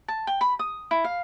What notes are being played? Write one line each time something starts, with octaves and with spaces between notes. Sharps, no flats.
A5
G5
B5
D#6
E4
F5